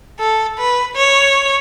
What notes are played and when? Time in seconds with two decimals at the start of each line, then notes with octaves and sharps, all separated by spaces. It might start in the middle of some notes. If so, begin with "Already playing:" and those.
0.20 A4
0.58 B4
0.96 C#5